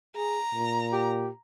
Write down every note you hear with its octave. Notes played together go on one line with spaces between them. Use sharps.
G#4 A#5
A#2
G4